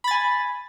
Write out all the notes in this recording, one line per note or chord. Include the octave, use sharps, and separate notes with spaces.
G#5 B5 A6